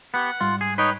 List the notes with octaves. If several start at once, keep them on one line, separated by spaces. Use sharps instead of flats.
B3 G4 F#5
G#2 G3 F4
G#4
D#4 B4 C#5 G5